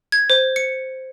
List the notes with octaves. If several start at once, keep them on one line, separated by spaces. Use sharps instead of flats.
G#6
C5
C#7